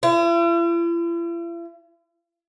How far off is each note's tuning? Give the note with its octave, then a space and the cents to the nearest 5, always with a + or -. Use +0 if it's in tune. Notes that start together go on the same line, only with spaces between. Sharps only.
E4 +45